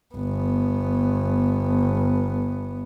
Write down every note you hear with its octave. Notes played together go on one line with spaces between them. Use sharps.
G1 B3